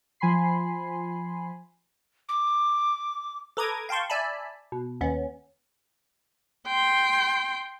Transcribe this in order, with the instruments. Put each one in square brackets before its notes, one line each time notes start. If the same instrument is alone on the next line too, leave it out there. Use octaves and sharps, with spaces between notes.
[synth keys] F3 G#5 B5 C6 C7
[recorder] D6
[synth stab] A4 B4 A#5 D6 D#6 G#6
F5 G5 A5 C6 C#6
D5 E5 G#5 A5 B5
B2
D#2 B3 C#4
[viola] G5 C6